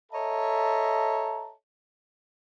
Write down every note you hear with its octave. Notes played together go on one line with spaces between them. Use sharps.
A4 C#5 D#5 E5 A5 A#5